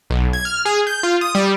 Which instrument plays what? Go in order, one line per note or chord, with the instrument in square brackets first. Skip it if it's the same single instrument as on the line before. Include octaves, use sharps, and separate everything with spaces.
[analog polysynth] B1
G#6
F6
G#4
G6
F4
D#6
G3